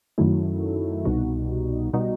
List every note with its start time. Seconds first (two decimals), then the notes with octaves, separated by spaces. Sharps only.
0.18 F#2 D#3 F#3 A3 E4
1.05 C2 B2 G3 D#4 F#4
1.93 B2 G3 D#4 F#4